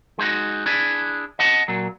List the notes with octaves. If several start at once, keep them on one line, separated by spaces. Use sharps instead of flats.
G#3 D#4 F#4
D4 E4 G#4
D#5 F#5 A5
A#2 F#3